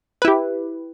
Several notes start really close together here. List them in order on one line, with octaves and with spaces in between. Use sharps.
B4 E4 G4